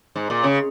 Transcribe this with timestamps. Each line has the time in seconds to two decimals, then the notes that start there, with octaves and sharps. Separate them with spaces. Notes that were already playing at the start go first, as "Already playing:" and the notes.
0.16 G#2
0.30 A#2
0.43 C#3